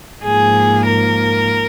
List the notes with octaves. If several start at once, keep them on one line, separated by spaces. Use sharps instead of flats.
G#2 F3 A#3 G#4
A#4